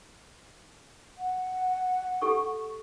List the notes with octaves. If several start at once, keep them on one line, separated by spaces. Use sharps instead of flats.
F#5
G4 A4 C#6